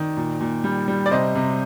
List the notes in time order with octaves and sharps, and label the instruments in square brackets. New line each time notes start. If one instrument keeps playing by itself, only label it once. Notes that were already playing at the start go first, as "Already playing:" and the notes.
Already playing: [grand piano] D#3 D5
A#2
A#2
G3
G3
D5
C3 C5 D#5
C3